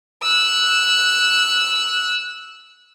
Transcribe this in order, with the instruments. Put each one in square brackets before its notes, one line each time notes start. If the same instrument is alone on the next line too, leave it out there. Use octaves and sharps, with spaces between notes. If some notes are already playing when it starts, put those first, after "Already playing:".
[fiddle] E6 F#6